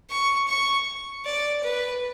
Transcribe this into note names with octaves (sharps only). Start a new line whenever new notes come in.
C#6
C#6
D5
B4